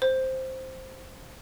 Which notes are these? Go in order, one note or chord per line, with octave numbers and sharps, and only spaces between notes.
C5